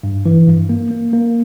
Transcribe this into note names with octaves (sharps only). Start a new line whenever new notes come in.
G2
E3
G2
A#3
A#3
A#3